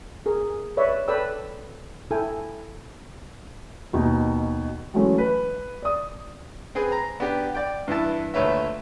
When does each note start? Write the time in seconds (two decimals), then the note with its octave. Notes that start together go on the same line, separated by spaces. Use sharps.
0.26 G#4 A#4
0.77 B4 C#5 D5 E5
1.08 A4 B4 D5 G5 B5 E6
2.11 E4 A4 G5 G#5
3.93 D#2 B2 D#4
4.94 E3 F#3 G#3 A3 C#4
5.18 B4
5.82 D5 D#6
6.75 C4 G#4 B4
6.92 A#5
7.20 B3 D4 G4
7.55 D5 G5
7.88 G2 E3 E4 A5
8.34 D2 A#2 A3 B4 C#5 E5